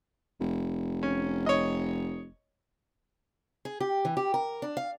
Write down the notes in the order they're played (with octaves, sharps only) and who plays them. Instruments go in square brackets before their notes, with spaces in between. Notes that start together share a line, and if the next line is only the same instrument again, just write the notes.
[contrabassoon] F1
[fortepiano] C#4
C#5 D#5
[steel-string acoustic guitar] G#4
G4
E3
G4
A#4
D4
F5